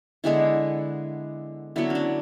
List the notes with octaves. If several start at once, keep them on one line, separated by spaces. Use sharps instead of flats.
D3 G#3 B3 E4
D3 F#3 B3 E4
C#4
D4